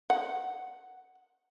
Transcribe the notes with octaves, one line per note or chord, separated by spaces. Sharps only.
F#5